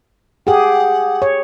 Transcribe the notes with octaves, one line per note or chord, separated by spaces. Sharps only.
G4 G#4 F#5
C#5